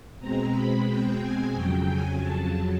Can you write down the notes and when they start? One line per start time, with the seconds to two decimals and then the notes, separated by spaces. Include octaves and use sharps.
0.20 B2 G#3 C4 A#5
0.53 B5
0.87 G5
1.20 G#5
1.53 F2 C#3 F#3 G5
1.88 G#5
2.21 A5